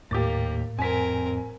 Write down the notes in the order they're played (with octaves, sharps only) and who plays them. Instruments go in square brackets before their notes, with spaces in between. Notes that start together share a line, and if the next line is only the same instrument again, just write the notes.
[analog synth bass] D#2 [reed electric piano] A2 [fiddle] A#3 [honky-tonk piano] G4 D6 A6
[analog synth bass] F2 [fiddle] C4 A#4 [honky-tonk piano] G#5 B6